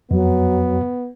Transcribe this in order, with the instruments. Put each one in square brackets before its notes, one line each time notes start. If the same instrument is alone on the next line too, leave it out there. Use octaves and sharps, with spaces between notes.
[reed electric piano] F2 [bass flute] F#3 [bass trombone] B3